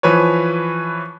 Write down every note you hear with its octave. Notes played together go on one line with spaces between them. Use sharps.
E3 F3 B4 C#5